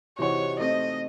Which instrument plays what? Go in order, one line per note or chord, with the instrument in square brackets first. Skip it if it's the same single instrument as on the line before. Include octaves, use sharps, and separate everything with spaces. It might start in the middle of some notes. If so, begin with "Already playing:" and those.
[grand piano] C3 E3 C4 D#4 F#4 [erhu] C#5
[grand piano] A3 C4 D#4 A4 [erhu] D#5